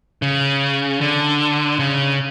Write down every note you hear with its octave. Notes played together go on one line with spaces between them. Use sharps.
C#3
D3
C#3